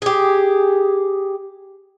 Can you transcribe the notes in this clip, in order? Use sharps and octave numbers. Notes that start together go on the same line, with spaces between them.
G4 G#4